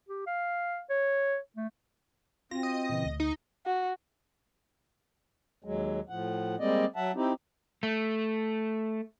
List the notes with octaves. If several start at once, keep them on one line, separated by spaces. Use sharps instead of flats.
G4
F5
C#5
A3
C4 F4 F#4 A#6
D#5
A#2 C#3 E3
D2
D#4
F#4
D#2 F#3 G#3
A2 F3 F#5
G3 G#3 A#3 C4 D5 D#5
F#3 E5 F#5 A5
C4 D#4 E4 G4
A3